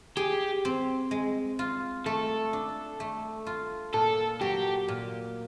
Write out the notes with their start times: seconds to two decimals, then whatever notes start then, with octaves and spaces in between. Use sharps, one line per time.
0.17 G4 G#4
0.65 C4
1.11 G#3
1.59 F4
2.06 A3 A4
2.53 D4
3.00 A3
3.47 F4
3.93 A#2 A4
4.41 F#3 G4
4.88 A#2